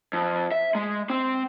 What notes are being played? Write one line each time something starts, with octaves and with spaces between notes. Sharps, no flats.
F2
E5
G#3
C4